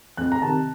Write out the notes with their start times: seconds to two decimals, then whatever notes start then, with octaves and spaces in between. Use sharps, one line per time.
0.17 F2 F#6
0.32 A#5
0.42 C3 D#3 A5